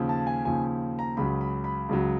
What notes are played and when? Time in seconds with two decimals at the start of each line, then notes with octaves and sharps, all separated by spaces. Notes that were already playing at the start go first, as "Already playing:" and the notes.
Already playing: D#2 C#3 F3
0.09 A5
0.27 G#5
0.45 D#2 C#3 F3 G#5
0.99 A#5
1.17 C#2 C#3 F#3 B5
1.41 B5
1.64 B5
1.89 C#2 C#3 F#3